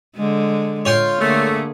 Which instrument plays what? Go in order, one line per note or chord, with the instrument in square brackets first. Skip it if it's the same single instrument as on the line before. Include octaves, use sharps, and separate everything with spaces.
[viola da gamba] D3 G#3
[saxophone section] F4 [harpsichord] C#5 G5 C6
[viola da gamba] D3 A#3 G#4 [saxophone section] A3